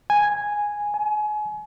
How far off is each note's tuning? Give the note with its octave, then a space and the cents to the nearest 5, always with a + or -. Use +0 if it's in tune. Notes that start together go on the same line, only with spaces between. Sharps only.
G#5 -5
G#5 +30